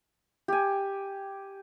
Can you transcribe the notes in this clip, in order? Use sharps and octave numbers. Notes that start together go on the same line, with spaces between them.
G4 G#5